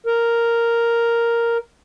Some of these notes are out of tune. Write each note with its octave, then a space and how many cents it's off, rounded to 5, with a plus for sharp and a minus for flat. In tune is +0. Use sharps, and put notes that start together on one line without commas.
A#4 +0